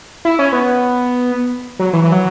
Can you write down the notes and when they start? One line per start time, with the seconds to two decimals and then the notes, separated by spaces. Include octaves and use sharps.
0.25 E4
0.39 C#4
0.53 B3
1.79 F#3
1.93 E3
2.03 E3
2.12 F#3